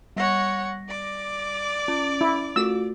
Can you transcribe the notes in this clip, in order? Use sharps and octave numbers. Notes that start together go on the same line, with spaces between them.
G3 C#5 F#5 A#6
D5 D6
C#4
E4
A3 F4 F#4 E6